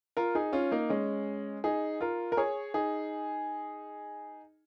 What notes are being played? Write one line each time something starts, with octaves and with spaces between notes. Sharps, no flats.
F4 A#4
D#4 G#4
C#4 F4
A#3 D#4
G#3 C#4
D#4 G#4
F4 A#4
A#4
G#4 C#5
D#4 G#4